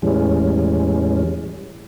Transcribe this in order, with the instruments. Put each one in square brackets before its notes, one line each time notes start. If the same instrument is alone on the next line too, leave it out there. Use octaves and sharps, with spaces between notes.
[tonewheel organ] E2 A2 E3 G3 G#3 C#4